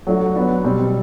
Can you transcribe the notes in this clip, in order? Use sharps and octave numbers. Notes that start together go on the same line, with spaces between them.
F#3 A3 D4 F#4
F#3 B3 D4
B2 G3 C4